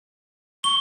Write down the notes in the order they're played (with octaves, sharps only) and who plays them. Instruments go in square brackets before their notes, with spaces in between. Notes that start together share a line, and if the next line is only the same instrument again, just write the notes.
[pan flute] C#6 [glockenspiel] G7